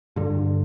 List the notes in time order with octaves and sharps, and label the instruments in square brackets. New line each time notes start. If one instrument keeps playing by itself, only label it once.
[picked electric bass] G2 D3